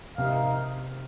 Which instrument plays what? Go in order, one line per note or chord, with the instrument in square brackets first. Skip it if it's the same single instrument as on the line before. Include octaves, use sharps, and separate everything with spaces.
[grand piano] C3 [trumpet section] D#4 A#4 F5